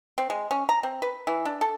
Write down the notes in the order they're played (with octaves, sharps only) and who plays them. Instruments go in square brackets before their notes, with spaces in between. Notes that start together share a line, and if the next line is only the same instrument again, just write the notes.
[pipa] C4
G#3
C#4
A#5
C4
B4
E3
D4
A4